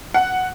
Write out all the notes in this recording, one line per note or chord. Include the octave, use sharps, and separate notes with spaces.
F#5